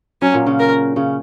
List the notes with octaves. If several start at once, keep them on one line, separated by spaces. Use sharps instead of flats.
F#3 C#4
A#2 A#3
C#3 C#4
A#4
C#3 C#4